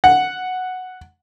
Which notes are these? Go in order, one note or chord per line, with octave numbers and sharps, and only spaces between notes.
F#5